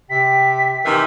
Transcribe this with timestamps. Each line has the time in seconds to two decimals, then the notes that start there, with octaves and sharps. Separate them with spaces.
0.10 C3 G5 B6
0.84 C3 D#3 E3